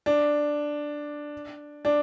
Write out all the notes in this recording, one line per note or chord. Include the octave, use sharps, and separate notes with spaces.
D4
D4